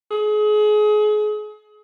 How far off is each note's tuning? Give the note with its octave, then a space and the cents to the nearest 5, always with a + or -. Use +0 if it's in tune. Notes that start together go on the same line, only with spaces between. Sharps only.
G#4 +30